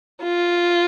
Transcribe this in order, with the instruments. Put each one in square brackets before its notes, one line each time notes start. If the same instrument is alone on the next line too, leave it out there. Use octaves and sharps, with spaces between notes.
[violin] F4